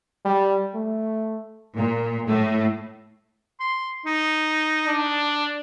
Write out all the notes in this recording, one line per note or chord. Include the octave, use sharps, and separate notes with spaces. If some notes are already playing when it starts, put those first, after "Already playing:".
G3
A3
A#2
A2 A3
C6
D#4
D4